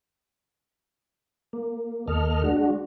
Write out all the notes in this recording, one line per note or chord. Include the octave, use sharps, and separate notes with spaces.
A#3
D#2 A#3 A4 D#5 F6
G#3 D4 F#4